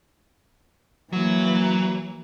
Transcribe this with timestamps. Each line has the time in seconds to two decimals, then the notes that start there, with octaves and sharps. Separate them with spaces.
1.13 E3 F#3 A#3